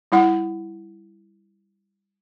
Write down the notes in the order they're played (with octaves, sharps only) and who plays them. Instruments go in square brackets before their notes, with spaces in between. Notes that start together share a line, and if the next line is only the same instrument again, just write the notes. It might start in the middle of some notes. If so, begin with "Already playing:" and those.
[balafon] G3 E4 F#5